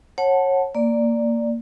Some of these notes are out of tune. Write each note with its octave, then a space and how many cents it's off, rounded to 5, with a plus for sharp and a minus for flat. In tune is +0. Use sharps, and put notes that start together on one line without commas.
C#5 -25 F#5 +0 A5 +0
A#3 -10 D5 +0